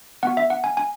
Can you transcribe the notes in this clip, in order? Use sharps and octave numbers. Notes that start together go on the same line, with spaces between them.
B3 F#4 F#5
E5
F#5
G#5
G#5